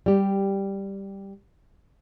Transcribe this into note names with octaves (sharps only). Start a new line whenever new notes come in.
G3 G4